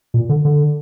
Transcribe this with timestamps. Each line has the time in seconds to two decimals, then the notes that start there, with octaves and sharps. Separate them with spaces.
0.14 A#2
0.29 D3
0.45 D3